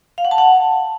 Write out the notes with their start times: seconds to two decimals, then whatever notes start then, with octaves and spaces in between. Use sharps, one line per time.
0.18 F5
0.25 F#5
0.31 A5
0.38 F#5